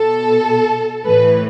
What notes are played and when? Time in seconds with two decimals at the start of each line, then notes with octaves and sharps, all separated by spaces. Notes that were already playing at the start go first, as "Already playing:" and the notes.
Already playing: B2 A4
1.06 A2 E3 B4